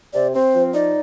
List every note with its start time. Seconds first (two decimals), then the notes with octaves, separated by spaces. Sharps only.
0.13 C3 D5
0.34 C4 C5
0.54 F3
0.74 D#4 D5